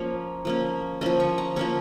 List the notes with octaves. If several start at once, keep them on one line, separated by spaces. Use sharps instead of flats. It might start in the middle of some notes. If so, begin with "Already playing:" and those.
Already playing: F3 A#3 C#4 C#5
F3 A#3 C#4
F3 A#3 C#4 D#5
C#6
A#5
F3 A#3 C#4 C#6